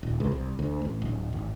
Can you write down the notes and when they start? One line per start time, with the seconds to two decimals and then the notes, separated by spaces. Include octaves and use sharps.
0.03 D#1
0.20 C#2
0.32 C2
0.59 D2
0.85 A1
1.02 D1
1.33 G#1